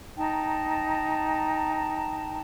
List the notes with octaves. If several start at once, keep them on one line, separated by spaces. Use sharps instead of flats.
D#4 G5 A5 A#5